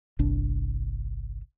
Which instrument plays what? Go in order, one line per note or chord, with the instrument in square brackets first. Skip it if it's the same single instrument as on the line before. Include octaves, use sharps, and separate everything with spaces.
[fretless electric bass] G1 C2 D4